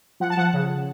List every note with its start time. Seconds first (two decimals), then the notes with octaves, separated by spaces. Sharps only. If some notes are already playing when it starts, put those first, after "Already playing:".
0.20 F3 F#5
0.30 A5
0.37 F3 F#5
0.53 C#3